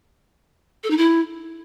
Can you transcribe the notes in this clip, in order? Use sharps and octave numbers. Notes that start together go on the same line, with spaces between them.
A4
D#4
E4